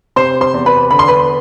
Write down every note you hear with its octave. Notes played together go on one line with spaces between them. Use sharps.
C3 C5 C6
C5 C6
E2
B4 B5
D3 B5
C6
B4 B5